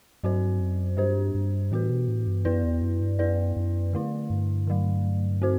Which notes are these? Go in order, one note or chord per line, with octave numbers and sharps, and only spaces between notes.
G2 F#3 C4 F#4 C5
F#2
G2 G3 D4 G4 C5
G2
A2 E3 B3 F#4 B4
B2
A2
G2
F#2 B3 E4 B4 D5
E2
F#2
G2
F#2 B3 E4 B4 D5
F#2
D3 A3 E4
G2
D3 F#3 A3
C4 F#4 C5